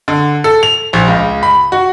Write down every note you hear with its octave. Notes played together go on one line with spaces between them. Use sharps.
D3
A4
F7
A#1
C#2
B5
F#4